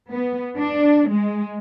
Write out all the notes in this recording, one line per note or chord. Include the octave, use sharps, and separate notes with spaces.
B3
D4
G#3